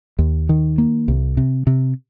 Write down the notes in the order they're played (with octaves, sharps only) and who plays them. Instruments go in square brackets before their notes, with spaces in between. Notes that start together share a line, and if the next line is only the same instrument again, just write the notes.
[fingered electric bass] D#2
D#3
A#3
C2
C3
C3